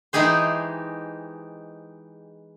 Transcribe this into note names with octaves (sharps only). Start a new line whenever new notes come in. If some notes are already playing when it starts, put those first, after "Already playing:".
E3 G#3 D#4 G4 G#4 C5